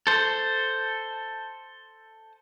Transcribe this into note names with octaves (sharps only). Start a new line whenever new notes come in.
A4 C5